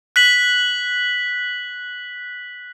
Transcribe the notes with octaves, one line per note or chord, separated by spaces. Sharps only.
F#6 B6 F#7